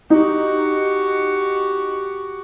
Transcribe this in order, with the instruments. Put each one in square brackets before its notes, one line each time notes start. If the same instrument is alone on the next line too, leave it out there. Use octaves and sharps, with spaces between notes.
[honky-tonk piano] D#4 [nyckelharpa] F#4 G4